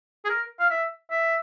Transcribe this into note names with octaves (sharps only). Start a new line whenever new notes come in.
G#4
A#4
F5
E5
E5